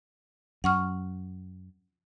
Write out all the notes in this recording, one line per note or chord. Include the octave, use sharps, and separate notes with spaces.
F#2 F#5 C#6 F6